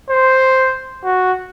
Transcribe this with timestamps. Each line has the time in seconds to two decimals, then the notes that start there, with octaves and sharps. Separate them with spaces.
0.10 C5
1.04 F#4